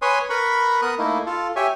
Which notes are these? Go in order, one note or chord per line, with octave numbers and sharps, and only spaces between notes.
B4 C#5 G#5 C6 D#6
A#4 B4 B5 C#6
B3 A#4 D#6 F#6
A3 A#3 D#4 E4
F4 A4
G4 C#5 E5 G#5